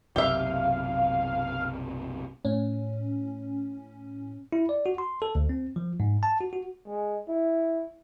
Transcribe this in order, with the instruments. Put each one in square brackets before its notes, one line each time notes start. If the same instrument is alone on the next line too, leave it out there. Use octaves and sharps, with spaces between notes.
[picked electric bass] F#1 B1 C3 [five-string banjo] G4 E5 [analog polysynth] F5
[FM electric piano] A2 C#4
[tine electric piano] E4
D5
F#4
C6
A4
D2
C4
F3
G#2
A5
F#4
F#4
[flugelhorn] G#3
E4